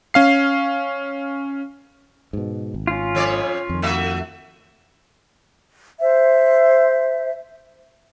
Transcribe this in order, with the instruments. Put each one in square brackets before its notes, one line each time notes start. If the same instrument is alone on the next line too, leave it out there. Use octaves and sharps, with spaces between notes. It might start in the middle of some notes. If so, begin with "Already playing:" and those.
[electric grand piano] C#4 F5 C7
[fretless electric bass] G#2 B2
G#1
[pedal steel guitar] C#4 F4
[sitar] F2 C#5 D5
[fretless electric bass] F2 D#3
[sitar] A3 F#4 E5
[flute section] C5 E5